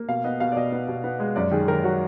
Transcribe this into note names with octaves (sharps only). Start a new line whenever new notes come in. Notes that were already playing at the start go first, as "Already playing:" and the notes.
Already playing: A#3
B2 F5
B3 D#5
B2 F5
D5
B2 D#5
B3
B2
B3
G#3
F#2 D5
D#3 G#4
D#3 A#4
F#3 F#4